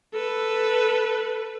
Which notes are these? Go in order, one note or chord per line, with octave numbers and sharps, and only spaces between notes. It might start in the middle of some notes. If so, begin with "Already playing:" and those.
A4 B4